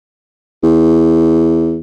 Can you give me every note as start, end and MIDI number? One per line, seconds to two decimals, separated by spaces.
0.63 1.80 40